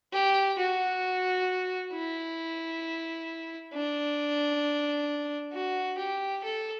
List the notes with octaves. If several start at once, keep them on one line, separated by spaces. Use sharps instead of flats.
G4
F#4
E4
D4
F#4
G4
A4